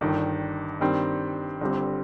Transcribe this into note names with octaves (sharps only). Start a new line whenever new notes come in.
G1 G2 D#3
G2 D#3 G3 C4
G1 G2 D3 G3 C4